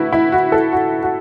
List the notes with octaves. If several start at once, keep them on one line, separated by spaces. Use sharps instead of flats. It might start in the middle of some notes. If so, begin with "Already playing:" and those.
Already playing: D3 A3 E4 F#4 B4
E4
F#4
A4
F#4
F#4